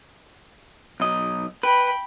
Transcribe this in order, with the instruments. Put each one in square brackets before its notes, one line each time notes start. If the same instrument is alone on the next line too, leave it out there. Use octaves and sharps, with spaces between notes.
[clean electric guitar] B1 D#5
[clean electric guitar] B4 [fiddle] G5 B5